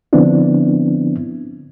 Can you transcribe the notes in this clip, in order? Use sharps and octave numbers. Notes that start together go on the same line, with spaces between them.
D3 F3 B3 C4 D4 E4